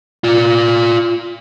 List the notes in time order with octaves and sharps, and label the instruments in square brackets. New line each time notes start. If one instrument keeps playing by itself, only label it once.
[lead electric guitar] F4 D5